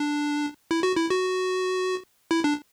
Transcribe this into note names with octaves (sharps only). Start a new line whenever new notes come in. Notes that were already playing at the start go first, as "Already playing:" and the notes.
Already playing: D4
E4
F#4
E4
F#4
E4
D4